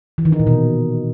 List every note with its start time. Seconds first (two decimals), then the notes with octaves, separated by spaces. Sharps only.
0.18 E3
0.25 D#3
0.32 D#4
0.40 A#2
0.47 B2